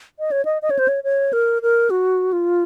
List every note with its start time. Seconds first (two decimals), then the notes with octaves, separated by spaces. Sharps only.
0.19 D#5
0.31 C#5
0.45 D#5
0.62 D#5
0.70 C#5
0.79 C5
0.88 C#5
1.04 C#5
1.33 A#4
1.62 A#4
1.90 F#4
2.33 F4